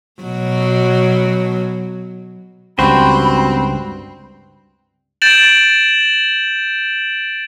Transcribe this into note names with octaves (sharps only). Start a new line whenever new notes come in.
B2 F#3
C#2 G2 C4 F#4 C5 B5
G6 A6 D7 E7 F#7